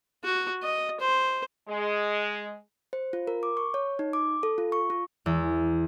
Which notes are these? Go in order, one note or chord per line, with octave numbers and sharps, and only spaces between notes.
F#4
D#5
C5
G#3
C5
F4
A#4
D6
C#6
C#5
D#4
D6
A4
F4
C#6
F4
E2